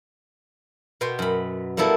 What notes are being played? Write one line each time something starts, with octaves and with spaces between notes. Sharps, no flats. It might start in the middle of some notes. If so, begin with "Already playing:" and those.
B2 B3 G5 C6
F#2 B5
G3 A#3 B3 E4 A4